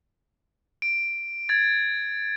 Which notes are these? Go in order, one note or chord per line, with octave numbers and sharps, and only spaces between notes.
D7
G#6 A6